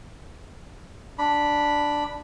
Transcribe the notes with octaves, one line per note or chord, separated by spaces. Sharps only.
D4 B5